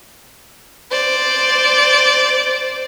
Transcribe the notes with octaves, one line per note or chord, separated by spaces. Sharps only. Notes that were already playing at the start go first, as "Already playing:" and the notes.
C5 D5